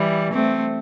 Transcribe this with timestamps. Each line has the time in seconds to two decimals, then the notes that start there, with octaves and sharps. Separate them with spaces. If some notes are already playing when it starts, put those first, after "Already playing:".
Already playing: E3 G3
0.33 A3 C4